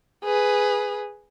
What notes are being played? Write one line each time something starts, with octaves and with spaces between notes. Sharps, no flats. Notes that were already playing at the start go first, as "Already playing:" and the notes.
G#4 B4